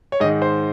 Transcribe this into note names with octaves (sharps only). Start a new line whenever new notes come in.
C#5
G#2 D#3 D#5
C5